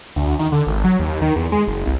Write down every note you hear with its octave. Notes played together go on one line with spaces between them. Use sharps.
D2
D#3
D3
G#1
F#3
D#2
D#3
E2
G#3
F#1
C2